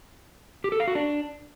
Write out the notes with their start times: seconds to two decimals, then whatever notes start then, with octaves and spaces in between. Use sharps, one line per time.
0.64 G4
0.72 A4
0.80 F5
0.88 F#4
0.95 D4